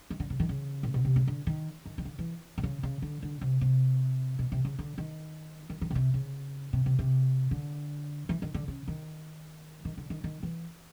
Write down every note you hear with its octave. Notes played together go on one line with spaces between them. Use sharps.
D#3
D3
C#3
D#3
C#3
A#2
B2
C3
C#3
D3
D#3
D#3
D#3
D3
E3
C3
C#3
C#3
D3
D3
C3
C3
B2
C3
C#3
D3
D#3
D#3
D#3
B2
C3
C#3
C3
C3
C3
D3
E3
D#3
D3
C#3
D#3
D#3
D3
D#3
D#3
E3